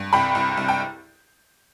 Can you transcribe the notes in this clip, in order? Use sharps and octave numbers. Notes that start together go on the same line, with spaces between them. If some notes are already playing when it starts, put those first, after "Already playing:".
Already playing: G2
C2 G5 B5
C2
C2
G5